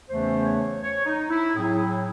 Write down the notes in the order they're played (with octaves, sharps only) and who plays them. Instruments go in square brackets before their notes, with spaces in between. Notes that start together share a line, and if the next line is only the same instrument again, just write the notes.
[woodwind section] E2 C#3 E3 A3 C#4 C5
C#5
C#5
D#4
E4
A2 F#3 C4 G#4
E4